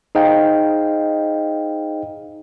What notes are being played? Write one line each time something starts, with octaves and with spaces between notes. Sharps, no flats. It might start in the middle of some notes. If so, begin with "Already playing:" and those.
D#4 G#4 C5 D#5 F5 G5